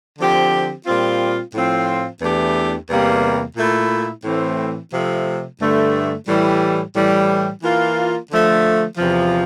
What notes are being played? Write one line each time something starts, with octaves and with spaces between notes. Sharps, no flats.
D3 F3 C4 G4
A#2 G3 C4 F4
A2 F3 C4 F4
E2 E3 A3 D4 G4
E2 C3 G3 A#3
A#2 A3 E4
A2 E3 A3 C4
C3 F3 A3
G2 D3 A3
A2 E3 G3
A2 E3 G3
E3 A#3 F4
D3 F3 A3
E2 C3 F3